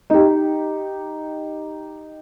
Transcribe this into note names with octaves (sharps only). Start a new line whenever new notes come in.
D#4 G4